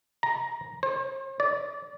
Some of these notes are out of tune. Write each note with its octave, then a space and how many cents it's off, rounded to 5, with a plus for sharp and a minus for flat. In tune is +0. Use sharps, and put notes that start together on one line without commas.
A#5 +5
C5 +45
D5 -25